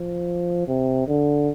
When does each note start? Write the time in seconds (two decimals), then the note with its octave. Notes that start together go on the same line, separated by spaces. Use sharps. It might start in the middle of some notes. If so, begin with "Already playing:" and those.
Already playing: F3
0.67 C3
1.07 D3